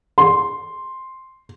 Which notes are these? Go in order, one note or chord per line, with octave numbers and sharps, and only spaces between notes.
C6